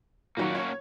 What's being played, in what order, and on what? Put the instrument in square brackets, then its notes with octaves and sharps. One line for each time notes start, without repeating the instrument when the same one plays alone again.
[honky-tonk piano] A#2 D#3 F#3 [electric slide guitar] A#3 C#4 F#4
[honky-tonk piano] C#5